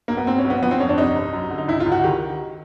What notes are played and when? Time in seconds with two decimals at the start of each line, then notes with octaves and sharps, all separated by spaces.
0.08 B1 A#3
0.17 B3
0.27 B1 C4
0.38 C#4
0.44 B1
0.50 B3
0.62 F3 B3
0.71 C4
0.80 F2 C#4
0.89 D4
0.98 C2 D#4
1.16 C2
1.33 F#2
1.50 D3
1.58 D#4
1.68 C#2 E4
1.80 F4
1.86 C#2
1.92 F#4
2.03 D#3 G4